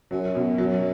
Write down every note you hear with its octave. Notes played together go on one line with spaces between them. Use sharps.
F#2 F#3
B2
F#3